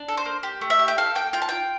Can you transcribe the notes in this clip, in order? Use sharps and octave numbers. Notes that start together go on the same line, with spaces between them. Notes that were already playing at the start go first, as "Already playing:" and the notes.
Already playing: D4
A4
C5
A#3
G4
A3
E5
G4
G5
A4 F5
A#3 G5
F4 G5
A5
F4 G5